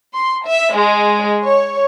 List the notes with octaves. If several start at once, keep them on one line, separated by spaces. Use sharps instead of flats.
C6
E5
G#3
C#5